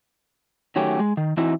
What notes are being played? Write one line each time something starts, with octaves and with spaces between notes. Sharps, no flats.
D#3 F#3 A3 C#4 G4
G#3
D#3
E3 C4 D#4 E4 F#4